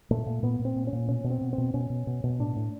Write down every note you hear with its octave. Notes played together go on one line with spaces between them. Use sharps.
A#2 A3
A#2
A#2 B3
A#2
C4
A#2
C#4
A#2
B2 C#4
B2
C4
B2
C4
B2
B2 C#4
B2
B2
B2
A2 D4
A2